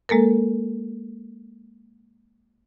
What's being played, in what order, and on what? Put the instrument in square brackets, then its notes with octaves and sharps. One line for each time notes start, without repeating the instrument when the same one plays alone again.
[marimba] G#3 A#3 A4 A#4